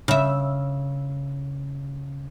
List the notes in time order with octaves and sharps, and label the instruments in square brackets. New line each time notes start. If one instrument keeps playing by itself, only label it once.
[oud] C#3 E5